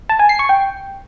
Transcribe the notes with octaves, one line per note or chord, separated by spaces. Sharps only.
A5
G#5
C7
C#6
G5